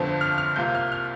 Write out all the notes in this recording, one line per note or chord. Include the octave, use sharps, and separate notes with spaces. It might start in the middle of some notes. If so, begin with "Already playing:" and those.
Already playing: G1 F2 D3 F3 C4
F6
F6
C2 C3 A#3 F4 G6
F6
F6